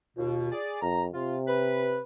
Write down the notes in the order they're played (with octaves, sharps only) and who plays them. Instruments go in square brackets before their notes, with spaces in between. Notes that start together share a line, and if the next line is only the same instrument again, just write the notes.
[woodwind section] D#2 B2 [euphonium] F4
[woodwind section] G#4 D5
[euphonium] F2 [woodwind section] A#5
[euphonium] C3 [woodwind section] F4
[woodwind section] B4